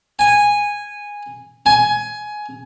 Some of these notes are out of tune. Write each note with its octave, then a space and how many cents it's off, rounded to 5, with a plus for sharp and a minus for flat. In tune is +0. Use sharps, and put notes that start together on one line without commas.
G#5 -10
G#5 +15